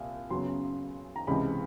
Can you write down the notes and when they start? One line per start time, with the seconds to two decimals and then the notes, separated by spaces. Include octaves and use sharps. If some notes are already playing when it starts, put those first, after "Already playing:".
Already playing: C2 A#2
0.30 F#2 C#3 F#3 B3 C6
1.16 A#5
1.27 C#2 C3 E3 G#3 B5